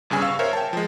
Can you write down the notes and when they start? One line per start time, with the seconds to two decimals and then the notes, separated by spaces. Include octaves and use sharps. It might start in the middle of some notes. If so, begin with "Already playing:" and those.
0.10 G1 G2 C#3 G#5 E6
0.22 F5 C#6 E6
0.39 A#4 C5 C#5 E5
0.53 G5 A5
0.73 F3 G#3